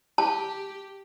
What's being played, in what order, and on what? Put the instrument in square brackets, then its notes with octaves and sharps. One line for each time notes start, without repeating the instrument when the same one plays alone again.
[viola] G4 [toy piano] A5